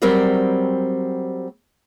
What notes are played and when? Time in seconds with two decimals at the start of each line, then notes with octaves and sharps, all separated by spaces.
0.02 F#3 G3 C4 A#4 C5 D5